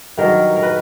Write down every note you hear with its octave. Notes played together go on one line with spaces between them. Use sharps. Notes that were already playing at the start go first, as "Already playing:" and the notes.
G2 D#3 F#3 A#4
A#4
B4